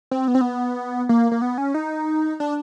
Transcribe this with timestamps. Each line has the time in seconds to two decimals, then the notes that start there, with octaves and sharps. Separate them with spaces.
0.11 C4
0.28 B3
0.35 C4
0.41 B3
1.09 A#3
1.31 A#3
1.42 B3
1.58 C#4
1.74 D#4
2.40 D4